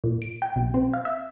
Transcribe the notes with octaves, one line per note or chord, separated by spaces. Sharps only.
A#2
D7
G5
B1
C4
F5
E5